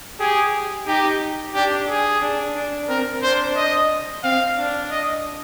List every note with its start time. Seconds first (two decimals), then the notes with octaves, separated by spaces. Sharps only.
0.19 G4 G#4
0.87 D#4 G4
1.54 D4 G4
1.88 G#4
2.21 D4
2.55 D4
2.88 C4 A#4
3.22 D4 C5
3.56 D#5
4.23 C4 F5
4.57 D4
4.90 D#5